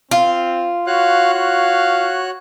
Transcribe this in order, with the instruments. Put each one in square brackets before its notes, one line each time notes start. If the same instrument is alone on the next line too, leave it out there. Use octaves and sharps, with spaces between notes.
[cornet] C4 [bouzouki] F4
[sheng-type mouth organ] F#4 C#5 F#6 [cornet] F5
[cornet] F5